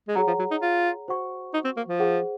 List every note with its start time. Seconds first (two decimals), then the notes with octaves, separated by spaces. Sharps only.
0.08 G#3
0.15 F#3 G#4 C#5 F#5 A#5
0.27 F3
0.39 F#3
0.51 D#4
0.62 F4
1.08 F#4 C5 F#5 C#6
1.54 D#4
1.65 C4
1.77 A#3
1.88 F3
2.00 G#4 C5 F#5